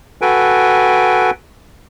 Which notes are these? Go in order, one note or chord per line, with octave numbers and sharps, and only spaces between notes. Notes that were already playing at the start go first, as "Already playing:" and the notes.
F#4 A4 B4 G5 G#5